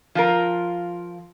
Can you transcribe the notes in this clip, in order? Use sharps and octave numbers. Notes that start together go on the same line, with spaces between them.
F3 F4 A#4